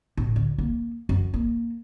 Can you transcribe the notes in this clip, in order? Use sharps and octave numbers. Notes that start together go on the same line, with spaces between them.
A2
D2
A#3
F#2
A#3